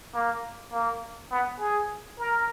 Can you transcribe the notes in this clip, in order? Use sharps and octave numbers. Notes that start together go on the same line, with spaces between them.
A#3
A#3
B3
G#4
A#4